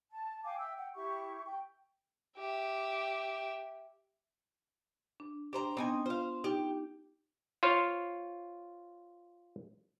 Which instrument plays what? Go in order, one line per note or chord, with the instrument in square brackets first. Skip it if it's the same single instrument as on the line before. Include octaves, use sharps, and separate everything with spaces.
[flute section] A5
F5 G5 G#5 D6
E5 G5 E6
F#5 G5
E4 G4 C#6
G5
[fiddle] G4 E5
[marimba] D4
[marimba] D4 [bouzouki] G4 C5 A#5
[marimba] B3 D4 [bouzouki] C4 D#4 G#5
[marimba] F4 [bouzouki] C5 F5
[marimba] D#4 [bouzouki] G4
[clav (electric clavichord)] F4 C5 C#5 F5